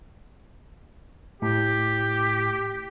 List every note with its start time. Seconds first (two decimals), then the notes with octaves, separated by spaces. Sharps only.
1.42 A2 G4